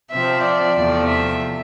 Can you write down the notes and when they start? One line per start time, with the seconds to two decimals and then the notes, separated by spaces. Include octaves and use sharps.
0.11 C3 F3 C4 E5
0.44 D5
0.76 E2 C3 F3 A3
1.08 E5